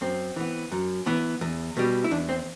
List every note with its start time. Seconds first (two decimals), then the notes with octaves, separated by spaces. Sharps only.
0.01 F#2 C4
0.36 E3 B3
0.72 F#2
1.06 E3 B3
1.41 E2
1.77 B2 G3
2.04 E4
2.11 E2 D4
2.29 C4